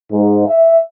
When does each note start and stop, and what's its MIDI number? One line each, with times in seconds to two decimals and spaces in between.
0.13 0.45 44
0.47 0.75 76